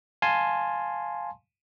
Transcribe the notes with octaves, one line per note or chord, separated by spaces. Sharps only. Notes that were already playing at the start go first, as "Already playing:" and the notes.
F5 G#5 A5 C6